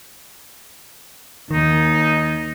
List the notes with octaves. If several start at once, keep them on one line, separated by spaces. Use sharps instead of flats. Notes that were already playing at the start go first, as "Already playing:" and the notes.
D#2 D#3 D#4